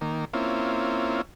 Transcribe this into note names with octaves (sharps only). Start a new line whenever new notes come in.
D#3 A#3
A#3 C4 C#4 E4 F4